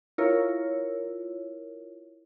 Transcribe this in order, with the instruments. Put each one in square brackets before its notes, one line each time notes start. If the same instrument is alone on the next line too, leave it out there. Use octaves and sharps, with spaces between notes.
[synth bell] E4 F4 A#4 C#5